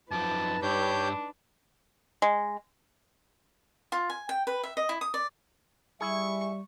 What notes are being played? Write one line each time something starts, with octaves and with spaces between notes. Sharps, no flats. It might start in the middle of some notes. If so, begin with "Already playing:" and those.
F#2 F3 D#4 B4 A5 D6
G2 D4 G4 C#5 G6
G#3
F4
G#5
G5
B4
E5
D#5
E4
D#6
D5
G3 E4 G#4 E5 C#6